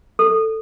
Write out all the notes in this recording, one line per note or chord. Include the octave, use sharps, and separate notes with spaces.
A4